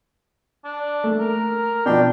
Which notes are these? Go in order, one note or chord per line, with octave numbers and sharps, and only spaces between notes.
D4
A3
A#4
B2 F3 D4 G5